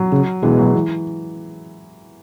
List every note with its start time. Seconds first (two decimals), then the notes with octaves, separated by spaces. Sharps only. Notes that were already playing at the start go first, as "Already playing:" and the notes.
Already playing: F#3
0.12 C#3
0.43 B2 E3 G#3
0.59 F#3
0.74 E3